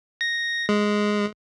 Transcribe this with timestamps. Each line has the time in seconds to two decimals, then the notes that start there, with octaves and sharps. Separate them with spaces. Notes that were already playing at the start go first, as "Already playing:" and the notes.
0.21 A#6
0.69 G#3